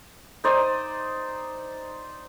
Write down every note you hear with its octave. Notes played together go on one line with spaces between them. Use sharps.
D#4 C5 D5 D#6